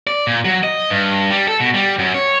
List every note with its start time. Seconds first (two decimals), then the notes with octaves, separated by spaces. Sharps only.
0.07 D5
0.27 A#2
0.45 F#3
0.64 D#5
0.90 G2
1.30 G3
1.48 A4
1.60 B2
1.74 G3
1.99 F#2
2.14 C#5